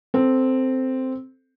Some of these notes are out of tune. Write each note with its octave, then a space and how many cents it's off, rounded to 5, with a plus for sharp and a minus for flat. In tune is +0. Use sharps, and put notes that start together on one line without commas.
C4 -5 A4 +0